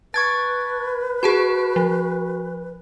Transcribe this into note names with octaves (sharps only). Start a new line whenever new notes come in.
B4 A5 C#6 G#6 A6
F#4 G#4 A5 B5
F3